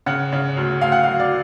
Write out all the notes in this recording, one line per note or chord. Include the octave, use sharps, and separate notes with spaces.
C#3 F#5
C#3
D2
D2 F5
F#5
F#3 F5
D5